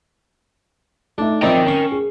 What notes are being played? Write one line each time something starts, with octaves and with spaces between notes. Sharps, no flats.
A3 D4 D#4 E5
F3 C4 D#4 A#4 D5 E5 G5 B5
C#4 C#6 C7
G#4